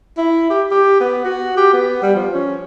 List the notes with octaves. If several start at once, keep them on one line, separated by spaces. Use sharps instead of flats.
E4
G4
G4
B3
F#4
G4
B3
G3
F3
C#4